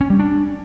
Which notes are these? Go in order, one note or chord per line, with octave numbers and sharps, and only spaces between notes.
C#4
G3
D4